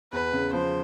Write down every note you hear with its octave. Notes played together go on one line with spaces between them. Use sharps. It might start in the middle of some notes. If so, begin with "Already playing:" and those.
E2 B4
C#3
F3 C5